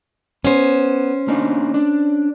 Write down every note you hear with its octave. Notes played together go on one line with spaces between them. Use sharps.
B3 C#4 C5
A#3 D4 D#4
D4